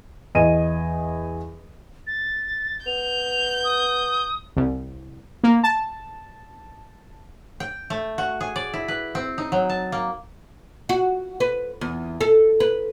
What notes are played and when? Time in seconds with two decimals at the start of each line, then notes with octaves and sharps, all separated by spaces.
0.35 E2 D#5 G#5 D#7
2.07 A6
2.86 B3 G6 F7
3.64 D#6
4.56 C2
5.44 A#3
5.63 A5
7.60 G5
7.90 A3
8.18 F#4
8.41 G#4
8.56 D5
8.73 E4
8.88 B4
9.15 C4
9.38 D#4
9.52 F#3
9.69 A5
9.92 A#3
10.89 F#4
11.40 B4
11.81 E2
12.21 A4
12.60 B4